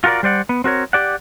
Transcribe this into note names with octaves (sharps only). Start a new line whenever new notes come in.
F4 F#4 A4 A#4 D5
G3 C5 D5 F#5
B3
C4 F#4 A#4 C#5
G4 D5 F#5